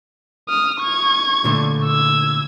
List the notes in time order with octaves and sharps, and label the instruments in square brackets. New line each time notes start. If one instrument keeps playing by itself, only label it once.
[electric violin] D#6 F6
C#6 G#6
[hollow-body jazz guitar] A#2 D3 A3
[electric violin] E6 G#6